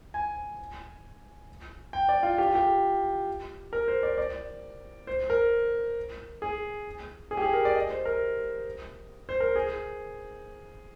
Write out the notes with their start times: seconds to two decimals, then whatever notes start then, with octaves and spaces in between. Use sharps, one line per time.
0.14 G#5
1.93 G5
2.09 D5
2.23 F4
2.38 G4
2.47 F4
2.55 G4
3.73 A#4
3.88 C5
4.03 D5
4.18 D5
5.07 C5
5.30 A#4
6.42 G#4
7.31 G#4
7.37 G4
7.42 G#4
7.53 A#4
7.65 D5
7.75 D#5
7.91 C5
8.05 A#4
9.29 C5
9.40 A#4
9.56 G#4